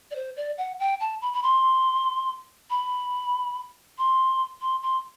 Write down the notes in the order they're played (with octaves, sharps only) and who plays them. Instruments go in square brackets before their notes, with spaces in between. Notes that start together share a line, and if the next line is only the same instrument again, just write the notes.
[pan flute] D5
C5
D5
F#5
G5
A5
B5
B5
C6
B5
C6
C6
C6